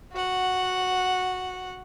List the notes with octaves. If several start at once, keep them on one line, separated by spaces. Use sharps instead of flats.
F#4 F#5